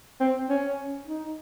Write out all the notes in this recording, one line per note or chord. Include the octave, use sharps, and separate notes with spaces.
C4
C#4
D#4